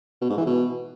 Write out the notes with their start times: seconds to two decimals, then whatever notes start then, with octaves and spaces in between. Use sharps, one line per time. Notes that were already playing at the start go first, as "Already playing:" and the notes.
0.21 B2
0.30 G#2
0.38 E3
0.46 B2